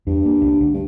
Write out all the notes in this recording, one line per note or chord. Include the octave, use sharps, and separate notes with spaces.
E2 G2
A#3
C2 D4
D2
G2